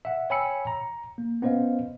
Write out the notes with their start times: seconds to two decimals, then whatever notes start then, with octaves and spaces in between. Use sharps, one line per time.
0.05 E5 F#5
0.30 C#5 G5 G#5 B5 E6 C#7
0.67 A#5
1.18 A#3
1.42 B3 C#4 C5 D#5 F5